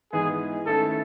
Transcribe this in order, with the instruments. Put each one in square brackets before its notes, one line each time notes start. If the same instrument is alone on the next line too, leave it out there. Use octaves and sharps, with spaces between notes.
[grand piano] G#2 E3 B3 D#4 [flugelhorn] G#4
[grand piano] D#3 A3 C#4 E4 [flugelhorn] A4